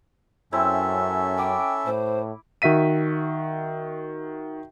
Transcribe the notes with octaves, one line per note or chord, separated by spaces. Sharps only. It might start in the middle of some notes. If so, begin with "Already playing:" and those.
F#2 C4 C#4 E4 A4 E5
G5 B5 D6
A2 C5
D#3 F#4 E5 B6 D#7